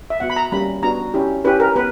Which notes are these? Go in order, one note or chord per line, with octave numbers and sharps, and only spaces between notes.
E5
B3 F#4 F#5
B5
A#5
G3 A#3 C#4 G4 B5
B3 D4 F#4 A#5
C#4 E4 G4
C#4 E4 G4 B4
A#4
B3 B4